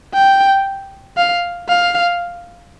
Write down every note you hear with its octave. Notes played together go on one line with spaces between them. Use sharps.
G5
F5
F5